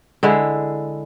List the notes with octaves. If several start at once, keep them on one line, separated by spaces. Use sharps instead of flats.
D3 G#3 E4